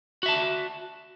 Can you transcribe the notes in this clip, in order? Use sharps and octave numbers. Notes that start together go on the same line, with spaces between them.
F#4 E5 A5